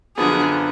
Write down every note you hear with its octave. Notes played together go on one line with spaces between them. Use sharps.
F#2 D3 F3 B3 D4 G#4